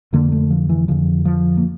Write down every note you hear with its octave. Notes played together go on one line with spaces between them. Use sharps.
F2 D3 A#3
A3
F3
E3
F2 D3 F3
F3
A#3